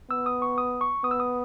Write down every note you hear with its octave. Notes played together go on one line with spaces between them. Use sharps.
B3 E6
D#6
C#6
D#6
C#6
B3 D#6
E6
D#6